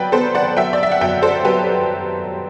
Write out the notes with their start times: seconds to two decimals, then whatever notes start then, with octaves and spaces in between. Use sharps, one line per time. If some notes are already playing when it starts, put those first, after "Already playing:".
Already playing: F#3 B4 D5 G5 B5
0.12 B3 A4 C5
0.35 D5 F#5
0.57 F#3 E5 G5
0.73 D5
0.83 E5
0.92 F#5
1.01 F#2 E5 G5
1.22 A4 C5
1.45 F#3 G4 B4